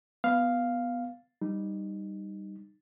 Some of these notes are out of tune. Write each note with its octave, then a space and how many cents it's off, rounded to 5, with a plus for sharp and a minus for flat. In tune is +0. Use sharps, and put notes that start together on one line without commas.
B3 +0 F5 +0
G3 +0 D#4 -10